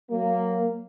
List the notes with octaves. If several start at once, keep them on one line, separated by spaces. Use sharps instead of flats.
F#3 A#3